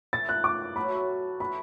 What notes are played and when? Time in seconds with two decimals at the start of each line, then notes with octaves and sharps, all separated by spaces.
0.13 E3 A3 E4 A6
0.29 F#6
0.44 D6
0.76 A2 F#3 A3 F#4 B5
1.40 E3 D4 F#4 B5